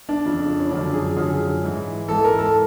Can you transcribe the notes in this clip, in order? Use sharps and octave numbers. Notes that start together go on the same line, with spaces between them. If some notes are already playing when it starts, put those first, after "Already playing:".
D4
F2 C#3 F3
C#4
F#2 D3 F3 D4
G#4
F#2 D3 F3 G#4
G#2 E3
G#2 E3 A4
A#4
A4